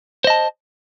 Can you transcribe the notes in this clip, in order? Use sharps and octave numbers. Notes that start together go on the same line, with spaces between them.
C5 D#5 A5